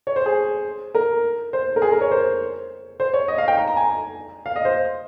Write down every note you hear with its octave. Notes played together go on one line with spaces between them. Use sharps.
C#5
C5
G#4
A#4
C5
A#4
G#4
A#4
C#5
C5
C5
C#5
D#5
F5
G5
A#5
A#5
G#5
F5
D#5
C5